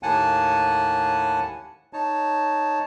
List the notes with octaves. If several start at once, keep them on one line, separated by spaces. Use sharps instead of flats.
D#2 A2 A#3 F#5 G#5 A5
D#4 C#5 A5